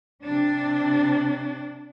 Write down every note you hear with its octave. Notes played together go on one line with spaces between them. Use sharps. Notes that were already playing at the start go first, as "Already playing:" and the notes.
C3 D4